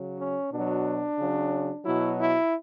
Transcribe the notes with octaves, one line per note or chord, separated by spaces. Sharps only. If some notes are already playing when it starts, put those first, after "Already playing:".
Already playing: C#3 F#3
C#4
B2 F#3 D4
C#3 F#3
B2 F#3 E4
E4